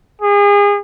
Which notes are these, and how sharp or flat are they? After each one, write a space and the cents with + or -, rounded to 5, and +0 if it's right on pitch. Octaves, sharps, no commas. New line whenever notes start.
G#4 -35